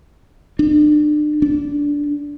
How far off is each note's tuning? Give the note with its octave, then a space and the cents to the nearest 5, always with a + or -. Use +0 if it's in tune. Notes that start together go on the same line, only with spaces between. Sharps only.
D4 +35
D4 -15